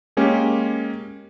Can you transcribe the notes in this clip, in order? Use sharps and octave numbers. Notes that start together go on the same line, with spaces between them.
G#3 A#3 C#4 G4